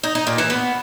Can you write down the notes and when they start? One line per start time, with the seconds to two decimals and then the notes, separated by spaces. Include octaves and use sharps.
0.04 D#4
0.15 D#4
0.27 A#2
0.38 E3
0.50 B3